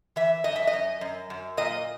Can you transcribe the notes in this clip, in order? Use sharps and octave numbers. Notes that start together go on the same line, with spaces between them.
E3 E5
F#2 D#5
E5
D#5
F#2
F#2
F#2
A#2 D#5